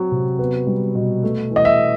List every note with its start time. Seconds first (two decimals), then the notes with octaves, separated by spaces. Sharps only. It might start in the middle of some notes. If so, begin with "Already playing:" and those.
Already playing: F#3 C4
0.12 C3
0.39 B3
0.67 G3
0.95 B2
1.23 A3
1.50 E3
1.56 D#5
1.65 E5